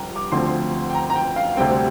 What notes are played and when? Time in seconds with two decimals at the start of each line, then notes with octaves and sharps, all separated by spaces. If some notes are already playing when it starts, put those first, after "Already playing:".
Already playing: G1 G2 F3 G5 A#5
0.16 D6
0.32 D2 D3 F3 C4 C6
0.89 G5
0.95 A#5
1.10 A#5
1.15 G5
1.36 F5
1.57 D2 C3 G3 C4 G5